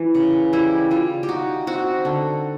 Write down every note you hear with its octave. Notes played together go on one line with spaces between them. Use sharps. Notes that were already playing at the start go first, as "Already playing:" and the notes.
Already playing: E3
C#3
G3 E4
G3 F4
G4
D#4 F#4
C4 F#4
D3